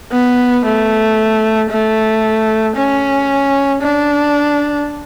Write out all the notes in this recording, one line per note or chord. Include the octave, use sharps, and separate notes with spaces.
B3
A3
A3
C#4
D4